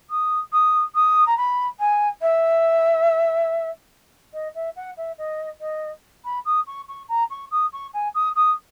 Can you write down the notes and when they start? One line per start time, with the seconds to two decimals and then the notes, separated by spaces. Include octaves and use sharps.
0.10 D#6
0.52 D#6
0.94 D#6
1.26 A#5
1.37 B5
1.79 G#5
2.21 E5
4.33 D#5
4.55 E5
4.76 F#5
4.97 E5
5.18 D#5
5.60 D#5
6.24 B5
6.45 D#6
6.66 C#6
6.88 C#6
7.08 A#5
7.30 C#6
7.51 D#6
7.72 C#6
7.93 G#5
8.14 D#6
8.36 D#6